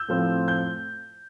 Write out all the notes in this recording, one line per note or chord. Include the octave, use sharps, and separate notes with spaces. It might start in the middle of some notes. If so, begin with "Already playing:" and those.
Already playing: E6 G6
A2 F3 C4
G6